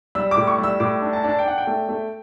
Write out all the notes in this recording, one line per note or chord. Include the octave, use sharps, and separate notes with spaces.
G3 E6
D6
A2
C#6
G3 E6
A2 D6
D4
A5
D4 A5
G5
D4 F#5
G5
A3
A3